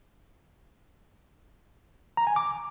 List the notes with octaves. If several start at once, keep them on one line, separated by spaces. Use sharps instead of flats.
A#5
G#5
D6